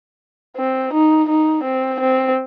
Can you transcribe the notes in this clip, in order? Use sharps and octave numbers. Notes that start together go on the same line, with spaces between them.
C4
D#4
D#4
C4
C4